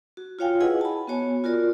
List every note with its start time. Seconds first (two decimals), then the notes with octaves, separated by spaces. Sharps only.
0.17 F#4
0.39 F4 F#4 C#5 F5 G5 G#5
0.61 E4 G#4 B4 D#5 F#5 G#5
0.81 A5 B5
1.07 B3 F#4 C#5 G#5
1.44 F4 F#4 A#4 D5